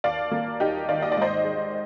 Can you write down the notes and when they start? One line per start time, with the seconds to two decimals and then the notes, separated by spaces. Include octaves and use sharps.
0.04 D#2 D5 F5
0.32 A#3
0.60 D#2 D#4 G4
0.89 D#3 D5 F5
1.02 D#5
1.12 G#2 D5
1.22 C5 D#5
1.45 G#3